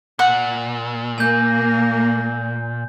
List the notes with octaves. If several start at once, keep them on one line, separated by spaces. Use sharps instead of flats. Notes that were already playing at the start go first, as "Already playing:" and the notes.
A#2 F#5
A#3 G#5 G6